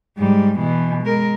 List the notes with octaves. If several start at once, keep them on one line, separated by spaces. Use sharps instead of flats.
G#2 G3
B2 E3
G#3 A#4